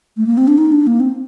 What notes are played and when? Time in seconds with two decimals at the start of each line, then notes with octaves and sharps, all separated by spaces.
0.17 A3
0.27 A#3
0.37 C4
0.47 D4
0.58 D#4
0.72 D4
0.87 A#3
1.00 C4